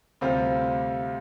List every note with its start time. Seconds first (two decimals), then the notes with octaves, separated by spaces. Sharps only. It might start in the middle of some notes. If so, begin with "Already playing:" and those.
0.21 D2 C3 G3 C4 F4